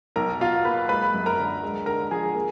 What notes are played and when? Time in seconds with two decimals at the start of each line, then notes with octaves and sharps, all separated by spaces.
0.16 B1 A#4 A#5
0.40 B2 F4 F5
0.65 A#3 B4 B5
0.89 G#3 B4 B5
1.14 F#2
1.26 A#4 A#5
1.38 D3
1.63 G#3
1.86 D3 A#4 A#5
2.11 F3 G#4 G#5
2.35 A#3